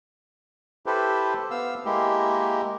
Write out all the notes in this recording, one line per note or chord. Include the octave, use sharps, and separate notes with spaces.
E4 G4 A4 B4 C5
B3 F5 E6
G#3 A#3 E4 G4